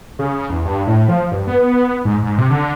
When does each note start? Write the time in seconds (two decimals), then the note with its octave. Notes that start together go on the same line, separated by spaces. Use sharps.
0.19 C#3
0.50 E2
0.65 G2
0.87 A2
1.08 F3
1.31 G2
1.47 B3
2.05 G#2
2.23 G#2
2.38 C3
2.50 D3